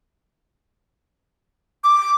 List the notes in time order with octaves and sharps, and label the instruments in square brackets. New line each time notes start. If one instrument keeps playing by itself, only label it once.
[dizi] D6